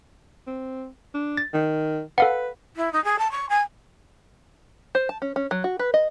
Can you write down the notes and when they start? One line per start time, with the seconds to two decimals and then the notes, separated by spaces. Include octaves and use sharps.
0.47 C4
1.14 D4
1.37 A6
1.54 D#3
2.18 A4 B4 F5 F#5
2.76 E4
2.93 D#4
3.04 G#4
3.18 A5
3.31 C#6
3.49 G#5
4.95 C5
5.09 A5
5.22 C#4
5.36 C#4
5.51 F#3
5.64 F#4
5.79 B4
5.94 D#5